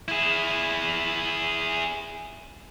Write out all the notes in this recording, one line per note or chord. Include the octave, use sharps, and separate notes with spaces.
E4 G#4